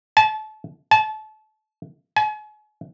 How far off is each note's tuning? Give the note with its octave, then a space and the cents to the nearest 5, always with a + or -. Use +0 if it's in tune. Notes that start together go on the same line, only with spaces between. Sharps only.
A5 -30
A5 -30
G#5 +40